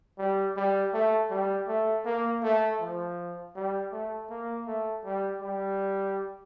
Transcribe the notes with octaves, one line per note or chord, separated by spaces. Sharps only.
G3
G3
A3
G3
A3
A#3
A3
F3
G3
A3
A#3
A3
G3
G3